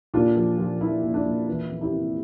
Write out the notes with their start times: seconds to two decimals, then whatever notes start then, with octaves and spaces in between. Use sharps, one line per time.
0.14 A#2 D4 F4
0.36 F3
0.58 F3
0.81 F3 E4
1.03 A#2
1.14 D4
1.26 A#2
1.47 E3 E4
1.70 F2
1.81 E4 G4
1.92 C3